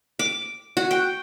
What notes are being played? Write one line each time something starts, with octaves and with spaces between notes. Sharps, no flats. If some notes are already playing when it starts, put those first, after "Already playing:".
D6
F#4
G5